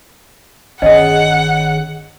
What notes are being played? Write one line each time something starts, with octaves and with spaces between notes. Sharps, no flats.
G1 D#3 C#4 G#4 D#5 F#5